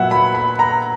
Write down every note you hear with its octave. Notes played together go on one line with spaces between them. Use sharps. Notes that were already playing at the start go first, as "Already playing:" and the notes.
Already playing: A#2 F#3 B3 E5 F#5
B5
B5
A#5